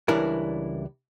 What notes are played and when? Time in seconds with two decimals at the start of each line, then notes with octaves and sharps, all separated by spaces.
0.08 C#2 E3 G3 D4 E4 A#4